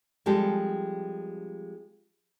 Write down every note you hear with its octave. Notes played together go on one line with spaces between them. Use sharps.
F3 G3 G#3 C4 G4 A4